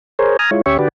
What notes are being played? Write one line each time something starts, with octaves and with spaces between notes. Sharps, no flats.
G#4 A#4 C5 C#5
G#5 A#5 D#6 F6
G#3 E4 F4 C#5
D2 C#4 G4 C#5 E5 C#6
D3 F#4 G4 B4 D5